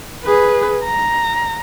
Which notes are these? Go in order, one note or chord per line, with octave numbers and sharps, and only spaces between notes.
G#4 B4
A#5